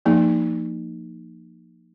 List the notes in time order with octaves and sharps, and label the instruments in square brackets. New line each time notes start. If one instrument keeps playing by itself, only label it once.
[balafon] F3 A#3 D#4 G#4